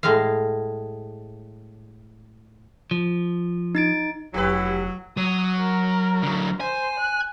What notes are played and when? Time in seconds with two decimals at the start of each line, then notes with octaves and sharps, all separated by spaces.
0.03 A2 G#3 F5
2.91 F3
3.75 D#4 A6 D7
4.34 F1 F#3 C#4 E4 G4 B4
5.17 F#3 D#6
5.58 A#4
6.23 D3 F#3
6.60 C5 G#5
6.99 F#6